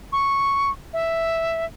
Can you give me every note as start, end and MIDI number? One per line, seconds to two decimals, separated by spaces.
0.13 0.70 85
0.93 1.65 76